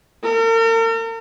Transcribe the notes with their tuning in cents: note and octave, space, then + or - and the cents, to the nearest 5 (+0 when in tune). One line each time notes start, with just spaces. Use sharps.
A#4 -40